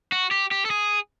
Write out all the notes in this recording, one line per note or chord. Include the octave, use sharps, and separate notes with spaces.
F#4
G4
G4
A4
G#4